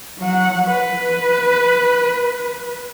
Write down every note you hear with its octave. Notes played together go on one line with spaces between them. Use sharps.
F#3 F#5
B4